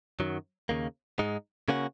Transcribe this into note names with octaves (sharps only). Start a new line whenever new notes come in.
F#2 D#3 F#3
D#2 C#3 A#3
G#2 G#3 D#4
C#3 A#3 C#4 F#4